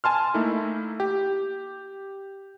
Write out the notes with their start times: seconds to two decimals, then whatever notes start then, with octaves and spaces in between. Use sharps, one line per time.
0.04 G#5 A5 C6 F6
0.34 A3 A#3 D#4 E4
1.00 G4